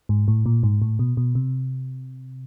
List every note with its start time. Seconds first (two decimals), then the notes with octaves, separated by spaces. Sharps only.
0.09 G#2
0.28 A2
0.46 A#2
0.63 G#2
0.82 A2
0.99 B2
1.17 B2
1.35 C3